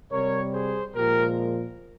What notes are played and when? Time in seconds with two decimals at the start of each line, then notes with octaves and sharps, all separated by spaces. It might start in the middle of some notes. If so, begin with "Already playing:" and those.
0.11 C3 G3 A#4 C#5
0.53 G#4 C5
0.95 A#2 F3 G#3 G4 A#4